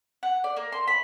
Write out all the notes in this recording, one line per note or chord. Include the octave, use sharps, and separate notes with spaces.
F#5
D5
A#3
C6
B5